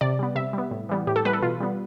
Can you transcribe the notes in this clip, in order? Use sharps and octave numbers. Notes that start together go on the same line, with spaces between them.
C3 D5
G3 B3
C3 E5
G3 B3
A2
E3 G3 B3
A2 G4
A4
E3 G3 B3 B4
A4
B2 F4
G3 B3